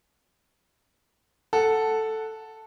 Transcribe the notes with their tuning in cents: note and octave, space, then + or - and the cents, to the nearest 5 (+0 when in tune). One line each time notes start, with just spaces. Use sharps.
A4 +0 F#5 +0